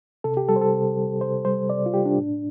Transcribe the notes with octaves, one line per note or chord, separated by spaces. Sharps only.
C3 A4
G4
G3 A4
C5
A4
C3
G3
C3 C5
G3 C5
C3 D5
F4
G3 G4
D4
A2